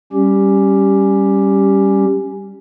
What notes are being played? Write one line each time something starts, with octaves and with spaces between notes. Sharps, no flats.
G3 C#4 G4